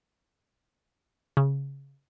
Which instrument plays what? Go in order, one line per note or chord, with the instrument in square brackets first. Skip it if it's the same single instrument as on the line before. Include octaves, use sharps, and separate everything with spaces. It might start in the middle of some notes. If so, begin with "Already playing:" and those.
[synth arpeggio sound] C#3